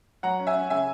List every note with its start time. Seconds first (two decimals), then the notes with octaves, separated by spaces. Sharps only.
0.23 F#3 F#5 A#5
0.40 C#4
0.47 E5 G#5
0.55 C#4
0.70 C#3 E5 G#5